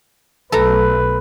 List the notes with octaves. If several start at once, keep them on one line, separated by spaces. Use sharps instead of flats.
B1 A3 A4 B4 A#5